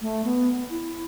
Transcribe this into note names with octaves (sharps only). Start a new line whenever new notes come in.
A3
B3
E4